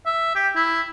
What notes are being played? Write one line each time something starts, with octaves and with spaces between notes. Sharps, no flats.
E5
G4
E4